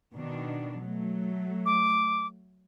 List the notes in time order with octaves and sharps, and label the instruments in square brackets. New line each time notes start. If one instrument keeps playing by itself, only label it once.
[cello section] B2 D#3 D4
F#3 A3
[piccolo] D6